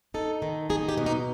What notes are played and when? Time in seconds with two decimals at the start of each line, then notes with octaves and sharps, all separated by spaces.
0.14 D#4 A4
0.42 D#3
0.70 D#4 G#4
0.89 G4
0.97 B2
1.06 D#4